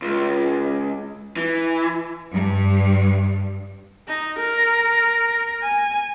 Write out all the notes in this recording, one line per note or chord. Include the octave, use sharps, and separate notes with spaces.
C#2
E3
G2
D#4
A#4
G#5